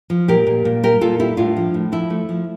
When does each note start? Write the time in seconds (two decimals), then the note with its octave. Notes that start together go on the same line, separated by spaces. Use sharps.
0.10 F3
0.28 A#2 G4 A#4
0.47 A#2
0.65 A#2
0.83 G3 G4 A#4
1.01 A#2 F4 A4
1.19 G3 E4 G4
1.37 A2 D4 F4
1.56 F3
1.74 A2
1.92 F3 E4
2.10 A3
2.29 F3